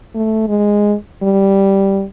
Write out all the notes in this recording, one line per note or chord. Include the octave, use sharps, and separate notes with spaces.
A3
G#3
G3